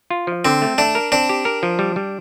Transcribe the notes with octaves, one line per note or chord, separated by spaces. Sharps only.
F4
F3
D3 C4
A3
A3 D4
A#4
C4 D4
G4
A#4
F3
G3
G3